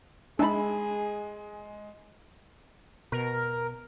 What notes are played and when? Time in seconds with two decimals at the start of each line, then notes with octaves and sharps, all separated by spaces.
0.39 G#3 D4 D#4 G#4 E5 A5 B5
3.12 B2 A#4